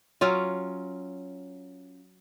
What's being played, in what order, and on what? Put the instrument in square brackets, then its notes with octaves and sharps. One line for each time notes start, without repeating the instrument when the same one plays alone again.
[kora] F#3 C#4 F4